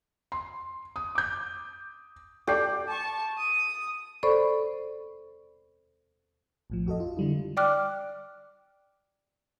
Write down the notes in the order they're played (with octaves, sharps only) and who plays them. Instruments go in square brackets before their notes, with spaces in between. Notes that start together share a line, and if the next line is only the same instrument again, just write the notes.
[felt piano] C6
D#6
D6 G6
[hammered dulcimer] G4 [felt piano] A4 D5 C7
[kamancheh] A5 C#6
D#6
[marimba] A4 C5 D5 B5 C#6
[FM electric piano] A#1 A2 F3
F2 F#4 A4 D#5
F4
D3 G3 E4
[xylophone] D5 G5 D6 F6 F#6